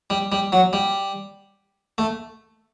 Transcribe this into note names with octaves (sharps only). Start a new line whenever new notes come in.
G3
G3
F#3
G3
A3